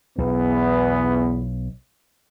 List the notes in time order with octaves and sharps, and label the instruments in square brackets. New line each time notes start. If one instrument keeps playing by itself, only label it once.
[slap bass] B1 [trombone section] E2 B3